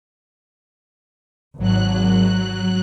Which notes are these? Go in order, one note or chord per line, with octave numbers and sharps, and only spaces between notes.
G#1 F#3 F#6